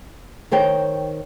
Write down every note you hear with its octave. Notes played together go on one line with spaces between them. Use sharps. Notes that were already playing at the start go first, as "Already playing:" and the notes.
D#3 C5 C#5 G5